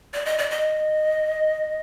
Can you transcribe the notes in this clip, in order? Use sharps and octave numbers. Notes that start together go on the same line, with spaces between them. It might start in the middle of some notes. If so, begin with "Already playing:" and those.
D5
D#5
D5
D#5